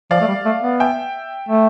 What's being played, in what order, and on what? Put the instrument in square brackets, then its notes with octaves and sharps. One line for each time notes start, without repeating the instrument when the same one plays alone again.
[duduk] F3 [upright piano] D5 F5
[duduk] A3
G3
A3
B3
[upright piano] E5 G5
[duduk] A3